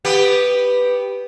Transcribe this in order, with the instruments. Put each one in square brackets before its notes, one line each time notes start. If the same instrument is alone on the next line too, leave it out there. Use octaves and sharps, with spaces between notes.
[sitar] B3 G4